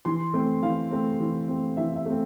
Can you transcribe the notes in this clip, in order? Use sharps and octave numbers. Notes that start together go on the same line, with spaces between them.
E3 C6
A3 C4
E3 F5
A3 C4
E3
A3 C4
E3 E5
E5
A3 C4